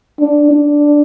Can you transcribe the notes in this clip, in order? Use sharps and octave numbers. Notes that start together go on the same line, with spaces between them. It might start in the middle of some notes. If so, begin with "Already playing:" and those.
D4
D4